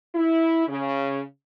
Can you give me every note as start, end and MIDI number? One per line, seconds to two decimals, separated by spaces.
0.16 0.67 64
0.67 1.21 49